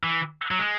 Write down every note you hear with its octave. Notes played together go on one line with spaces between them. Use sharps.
E3
F#3
G#3